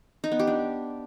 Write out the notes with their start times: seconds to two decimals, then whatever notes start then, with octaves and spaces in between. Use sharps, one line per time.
0.24 D#4
0.32 B3
0.39 G4
0.47 D4